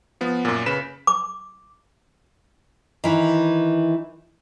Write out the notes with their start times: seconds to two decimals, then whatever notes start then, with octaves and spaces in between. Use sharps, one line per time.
0.21 F3 B3
0.45 F#2 A#2
0.66 C#3 B4 B6 E7
1.07 D6
3.04 D#3 E3